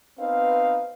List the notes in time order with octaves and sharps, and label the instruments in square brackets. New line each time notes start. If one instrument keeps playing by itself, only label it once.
[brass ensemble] B3 C4 D#4 B4 F5